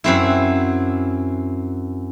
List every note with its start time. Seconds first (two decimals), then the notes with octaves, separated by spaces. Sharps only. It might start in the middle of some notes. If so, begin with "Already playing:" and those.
0.04 F#2 C4 E4